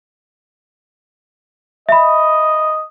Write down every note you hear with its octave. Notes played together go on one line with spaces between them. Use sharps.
D#5 E5 B5